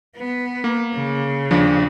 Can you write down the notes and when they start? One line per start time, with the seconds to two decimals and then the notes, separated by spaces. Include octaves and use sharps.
0.17 B3
0.64 A#3
0.95 C#3
1.51 D#2 F3 D4